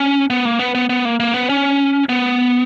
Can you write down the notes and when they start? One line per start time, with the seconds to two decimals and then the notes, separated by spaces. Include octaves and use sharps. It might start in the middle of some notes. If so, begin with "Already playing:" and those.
Already playing: C#4
0.30 B3
0.45 A#3
0.59 B3
0.75 B3
0.89 B3
1.05 A#3
1.20 A#3
1.34 B3
1.49 C#4
2.09 B3